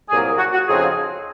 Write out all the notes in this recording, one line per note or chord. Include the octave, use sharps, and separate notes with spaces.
C2 A#2 F#3 A#3 G#4
F#4
F#4
F2 C#3 F3 C4 D#4 G#4